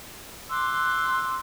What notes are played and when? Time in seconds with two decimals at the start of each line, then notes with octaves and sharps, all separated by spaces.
0.50 C6 D6 E6 F#6